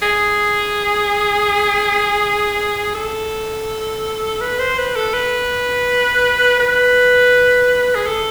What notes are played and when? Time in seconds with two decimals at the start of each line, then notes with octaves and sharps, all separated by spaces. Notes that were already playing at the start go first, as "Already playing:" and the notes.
0.02 G#4
2.95 A4
4.41 B4
4.59 C5
4.78 B4
4.96 A4
5.14 B4
6.60 B4
7.95 G#4
8.07 A4